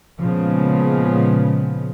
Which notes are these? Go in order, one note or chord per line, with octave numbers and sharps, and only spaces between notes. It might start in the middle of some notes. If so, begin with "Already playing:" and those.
A#2 C#3 F3 G#3 B3